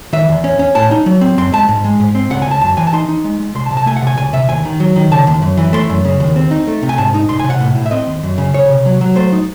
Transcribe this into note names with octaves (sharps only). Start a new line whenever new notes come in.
D#3 E5
E2
C#4
C#4
A2 A5
D#4
F#3
C4
F#2 C6
G#3 A5
G#2
G#3
G#2
C4
C#2 F#5
G#5
C#2 A5
F#2 A5
E3 G#5
A5
D#4 C6
D#4
G#3
G#3
C2 C6
A5
C3
A5
A3 G#5
F#5
C3 G#5
C#2 G#5
C3 E5
D#2 G#5
D#3
F#3
D#3
C#3 A5
D#2
F#2
E3
A3 C6
F#2
C#3
D#2
C4
D#4
A3
C3
G#5
G#2 A5
D#4
C2 C6
G#5
C3
F#5
A2
A2
E5
C4 D#5
D#2
F#2
C#3
C2 C#5
C3
F#3
F#3
A3 C5
D#4